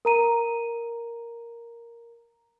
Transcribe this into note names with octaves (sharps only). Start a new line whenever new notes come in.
A#4 A#5 D#7